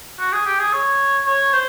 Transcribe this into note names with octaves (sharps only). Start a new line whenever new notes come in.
F#4
G#4
G4
G#4
C#5
C#5
C5